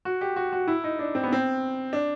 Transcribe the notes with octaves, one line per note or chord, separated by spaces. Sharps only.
F#4
G4
F#4
F#4
E4
D#4
D4
C4
B3
C4
D4